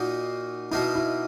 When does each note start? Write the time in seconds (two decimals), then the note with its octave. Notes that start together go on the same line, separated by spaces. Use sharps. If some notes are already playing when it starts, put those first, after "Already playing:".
Already playing: A#2 A#3 D#4 F#4
0.71 B2 A#3 D#4 E4
0.95 E4